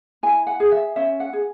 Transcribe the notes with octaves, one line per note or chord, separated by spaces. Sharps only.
E4 G#5
F#5
G#4
E5
C#4 E5
F#5
G#4